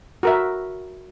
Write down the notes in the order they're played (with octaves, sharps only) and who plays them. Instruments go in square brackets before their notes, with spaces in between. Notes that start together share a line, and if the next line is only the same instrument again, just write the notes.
[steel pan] F#4 A#4 E5